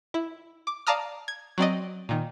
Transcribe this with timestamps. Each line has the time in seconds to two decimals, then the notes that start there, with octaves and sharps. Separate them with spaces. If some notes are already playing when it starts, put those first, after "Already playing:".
0.14 E4
0.67 D6
0.87 D5 F5 A5 A#5 D#6 F6
1.28 G#6
1.58 F#3 C4 D5 D#5
2.09 A#2 D#3